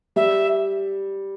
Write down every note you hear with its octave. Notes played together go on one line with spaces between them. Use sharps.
G3 E5